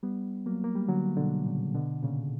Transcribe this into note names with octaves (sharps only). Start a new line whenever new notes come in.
G3 B3
F#3 A#3
A#3
G3
D3 F#3
B2 D3
A#2 C#3
B2 D3
A#2 C#3